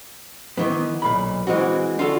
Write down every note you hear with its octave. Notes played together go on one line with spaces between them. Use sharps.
D#3 E3 B3
B1 A#2 B5
E3 G#3 C4 F#4
D3 F4 F#4 A4